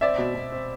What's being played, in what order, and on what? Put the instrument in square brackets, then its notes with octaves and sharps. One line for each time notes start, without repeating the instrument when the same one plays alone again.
[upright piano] C4 D5 E5
B2
B2
C4